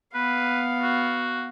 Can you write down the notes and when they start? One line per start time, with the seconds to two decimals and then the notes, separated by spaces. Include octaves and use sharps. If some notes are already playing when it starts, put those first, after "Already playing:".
0.15 B3 B4 F5
0.82 F#4